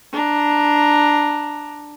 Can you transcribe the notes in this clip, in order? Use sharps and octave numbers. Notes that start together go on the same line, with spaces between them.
D4 A#5